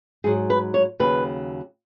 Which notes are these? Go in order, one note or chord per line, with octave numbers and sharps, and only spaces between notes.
G#2 F#3 G#4
B4
C#5
D#2 C#3 F#3 B4